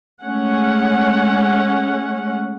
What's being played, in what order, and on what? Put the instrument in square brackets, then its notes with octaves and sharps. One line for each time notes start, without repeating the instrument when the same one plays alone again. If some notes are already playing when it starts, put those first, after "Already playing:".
[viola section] G#3 A3 C#4 F#5